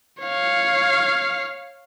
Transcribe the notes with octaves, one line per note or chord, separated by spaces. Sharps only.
C#5 F5